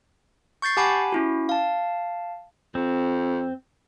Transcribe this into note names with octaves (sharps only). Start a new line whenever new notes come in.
C#6 G6 A6 C7
G4 F#5 G#5 A5 B5 D6
C#4 E4 F#4
F5 A5
F2 C4